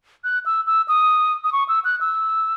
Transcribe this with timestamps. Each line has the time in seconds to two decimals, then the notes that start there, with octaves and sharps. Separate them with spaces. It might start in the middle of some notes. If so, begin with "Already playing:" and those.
0.24 F#6
0.46 E6
0.67 E6
0.88 D#6
1.44 D#6
1.52 C#6
1.68 E6
1.85 F#6
2.01 E6